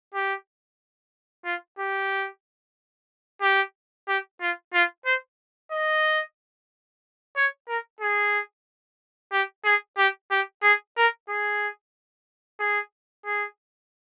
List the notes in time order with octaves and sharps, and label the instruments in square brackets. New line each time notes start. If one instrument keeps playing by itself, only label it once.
[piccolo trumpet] G4
F4
G4
G4
G4
F4
F4
C5
D#5
C#5
A#4
G#4
G4
G#4
G4
G4
G#4
A#4
G#4
G#4
G#4